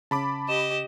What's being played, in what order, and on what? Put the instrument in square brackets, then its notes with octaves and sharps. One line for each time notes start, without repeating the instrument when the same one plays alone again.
[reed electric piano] C#3 C#4 [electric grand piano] A5 B5 D6
[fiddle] G4 D#5 [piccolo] E7